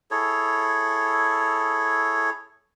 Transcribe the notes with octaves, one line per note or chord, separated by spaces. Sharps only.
E4 G#4 A4 C#5